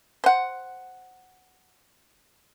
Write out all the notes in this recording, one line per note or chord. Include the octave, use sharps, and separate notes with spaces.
C5 F#5